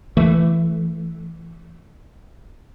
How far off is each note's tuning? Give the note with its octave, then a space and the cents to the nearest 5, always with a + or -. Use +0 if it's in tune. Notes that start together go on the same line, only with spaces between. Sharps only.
E3 +15 A3 +0